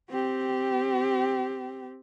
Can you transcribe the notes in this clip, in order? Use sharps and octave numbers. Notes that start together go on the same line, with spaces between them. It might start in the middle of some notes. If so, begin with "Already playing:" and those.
C4 G4